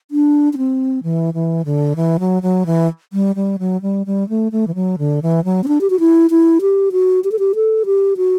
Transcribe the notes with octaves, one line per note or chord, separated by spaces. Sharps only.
D4
D4
C4
E3
E3
D3
E3
F#3
F#3
E3
G3
G3
F#3
G3
G3
A3
A3
E3
F#3
D3
E3
F#3
C4
D4
G4
F#4
E4
E4
G4
F#4
G4
A4
G4
A4
G4
F#4